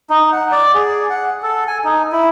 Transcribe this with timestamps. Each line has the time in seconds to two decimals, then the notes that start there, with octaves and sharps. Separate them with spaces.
0.10 D#4
0.33 F#5
0.52 D5
0.75 G#4
1.10 F#5
1.43 A4
1.67 G#5
1.84 D#4
2.12 E4